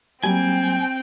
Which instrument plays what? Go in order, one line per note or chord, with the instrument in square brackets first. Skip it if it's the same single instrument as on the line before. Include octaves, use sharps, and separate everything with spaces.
[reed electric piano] F#3 G3 A#3 [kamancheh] C4 G5 [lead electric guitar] G#5